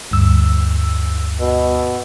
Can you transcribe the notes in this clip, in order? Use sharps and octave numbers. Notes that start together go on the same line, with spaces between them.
D2 G2 E6
B2